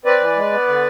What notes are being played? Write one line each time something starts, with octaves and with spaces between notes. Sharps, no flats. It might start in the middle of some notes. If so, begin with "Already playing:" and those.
C4 B4 D5
E3
G#3
B3
D3